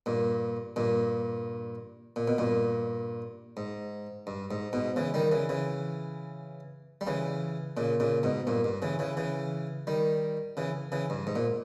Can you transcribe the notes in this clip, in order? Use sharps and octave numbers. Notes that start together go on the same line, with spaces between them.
G2 A#2
G2 A#2
A#2
B2
G2 A#2
G#2
G2
G#2
G#2 B2
C#3 E3
D#3 G3
C#3 E3
C#3 E3
G3
C#3 E3
A#2 C#3
A#2 C#3
G#2 B2
G2 A#2
G2
C#3 E3
C#3 E3
C#3 E3
D#3 G3
C#3 E3
C#3 E3
G2
G#2
A#2